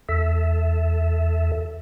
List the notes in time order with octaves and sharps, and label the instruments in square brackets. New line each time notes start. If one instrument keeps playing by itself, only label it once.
[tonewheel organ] E2 A4 E5